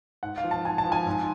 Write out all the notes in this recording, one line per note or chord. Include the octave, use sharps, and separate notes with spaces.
G#2 F#5
F5
F3
A5
G#2 G#5
A5
F3
G#5
G#2